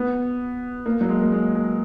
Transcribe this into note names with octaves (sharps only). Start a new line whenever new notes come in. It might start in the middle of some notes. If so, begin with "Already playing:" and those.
Already playing: B3
A#3
F#3
G#3
A#3
G#3
G#3